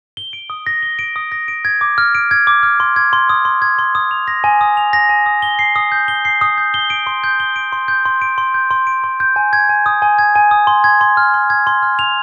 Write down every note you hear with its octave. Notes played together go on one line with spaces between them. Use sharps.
G7
D7
D#6
A#6
G7
D7
D#6
A#6
D7
G#6
D6
F6
D7
G#6
D6
F6
C6
G#6
C6
D#6
C6
G#6
C6
D#6
F7
A#6
G#5
D#6
F7
A#6
G#5
D#6
G7
C7
D#6
G6
G7
C7
D#6
G6
G7
D7
C6
G6
G7
D7
C6
G6
C6
D7
C6
G6
C6
D7
C6
G6
G#5
G#6
G#5
D#6
G#5
G#6
G#5
D#6
C6
G#6
C6
F6
C6
G#6
C6
F6
F7